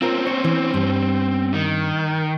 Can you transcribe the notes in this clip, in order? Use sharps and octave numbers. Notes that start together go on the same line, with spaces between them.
C4 C#4 F4 A#4
C#5
E3
G2
D#3